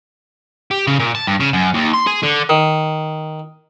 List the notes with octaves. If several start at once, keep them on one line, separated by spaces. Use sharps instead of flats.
G4
C#3
A#2
A5
G2
C#3
F#2
D#2
C6
G#4
D3
D#3